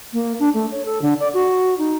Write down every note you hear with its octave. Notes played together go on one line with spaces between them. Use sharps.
A#3
D4
A3
C#5
A4
D3
D5
F#4
D#4